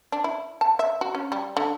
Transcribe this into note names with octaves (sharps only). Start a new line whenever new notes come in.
D4
E4
A5
E5
F#4
C#4
G3
D3